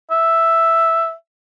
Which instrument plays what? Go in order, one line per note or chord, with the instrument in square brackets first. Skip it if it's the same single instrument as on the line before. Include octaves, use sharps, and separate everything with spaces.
[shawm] E5